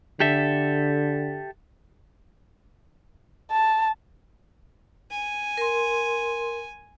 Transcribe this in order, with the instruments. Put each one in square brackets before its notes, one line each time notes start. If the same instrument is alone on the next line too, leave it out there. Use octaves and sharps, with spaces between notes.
[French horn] D3 [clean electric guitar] G4 A4 E5
[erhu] A5
[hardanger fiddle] G#5
[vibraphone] A#4 C6